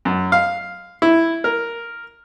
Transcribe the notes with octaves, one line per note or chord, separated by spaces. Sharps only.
F#2
F5
E4
A#4